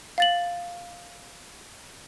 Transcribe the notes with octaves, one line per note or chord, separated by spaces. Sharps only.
F5 A6 F#7